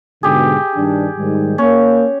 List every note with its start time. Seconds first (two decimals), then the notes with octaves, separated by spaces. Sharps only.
0.23 G#2 B2 D3 G4 G#4
0.76 G2 D#3 D4
1.18 G#2 D#3 G3
1.58 A#3 C#4